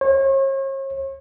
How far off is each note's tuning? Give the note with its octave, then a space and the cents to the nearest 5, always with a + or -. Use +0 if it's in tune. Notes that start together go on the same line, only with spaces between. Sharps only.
C#5 -40